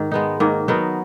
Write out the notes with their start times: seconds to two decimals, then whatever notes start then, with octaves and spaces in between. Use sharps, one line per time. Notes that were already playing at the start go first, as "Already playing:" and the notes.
Already playing: G#2 D#3
0.11 G#3 B3 D#4
0.40 G#2 D#3 A#3
0.68 F#3 B3 D#4 A#4